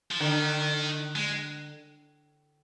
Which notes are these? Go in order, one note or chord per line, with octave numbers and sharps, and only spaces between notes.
F3
D3 D#3
G#3